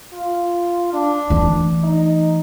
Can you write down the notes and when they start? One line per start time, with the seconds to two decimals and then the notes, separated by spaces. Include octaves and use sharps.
0.14 F4
0.94 D4
1.30 E3 A3
1.84 D#4